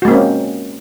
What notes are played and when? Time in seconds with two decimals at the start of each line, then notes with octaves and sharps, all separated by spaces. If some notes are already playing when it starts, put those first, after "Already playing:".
0.02 F#4
0.05 G#3
0.08 A#3
0.11 C4
0.14 C#4